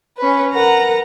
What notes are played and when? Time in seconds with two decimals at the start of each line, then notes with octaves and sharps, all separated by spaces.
0.17 C#4 B4
0.52 A#4 B4 F#5 A#5